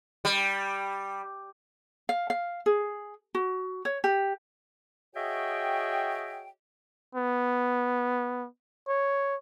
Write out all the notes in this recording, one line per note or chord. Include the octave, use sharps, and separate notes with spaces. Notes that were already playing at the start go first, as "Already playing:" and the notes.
G3
F5
F5
G#4
F#4
C#5
G4
F#4 G#4 C#5 D#5 E5 G5
B3
C#5